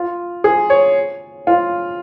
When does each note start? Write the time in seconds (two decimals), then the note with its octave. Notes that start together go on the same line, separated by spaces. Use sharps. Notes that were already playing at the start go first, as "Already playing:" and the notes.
Already playing: F4
0.44 G#4
0.70 C#5
1.47 F4